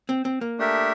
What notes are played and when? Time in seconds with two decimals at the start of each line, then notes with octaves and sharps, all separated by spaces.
0.09 C4
0.25 C4
0.41 A#3
0.59 A3 D4 G4 A#4 E5